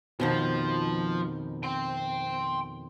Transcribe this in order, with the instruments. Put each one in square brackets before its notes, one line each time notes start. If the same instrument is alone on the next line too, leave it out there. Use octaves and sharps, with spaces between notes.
[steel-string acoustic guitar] F2 B2 D#3 [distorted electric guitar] F3
[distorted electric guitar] G5 C6